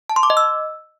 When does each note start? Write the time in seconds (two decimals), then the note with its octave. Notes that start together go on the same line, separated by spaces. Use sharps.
0.10 A5
0.16 C6
0.23 D6
0.30 D#5
0.37 E6